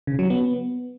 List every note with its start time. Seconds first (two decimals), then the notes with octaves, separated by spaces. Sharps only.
0.07 C#3
0.19 F#3
0.30 B3